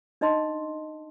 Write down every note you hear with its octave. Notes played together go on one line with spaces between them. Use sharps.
D4 D#4 D#5 A5 C6